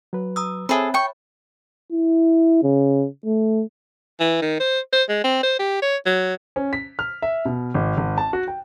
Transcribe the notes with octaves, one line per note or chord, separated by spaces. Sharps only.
F#3 B4
A#5 D#6 E6
C4 G#4 A4 C#5 E5 B5
G5 C#6
E4
C#3
A3
E3
D#3
C5
C5
G#3
C4
C5
G4
C#5
F#3
C#4
B6
F6
E5
B2
G#1
G#1
A5
F#4
G5